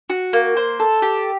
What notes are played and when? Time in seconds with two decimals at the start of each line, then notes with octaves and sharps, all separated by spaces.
0.10 F#4
0.33 A#3
0.57 C5
0.80 A4
1.02 G4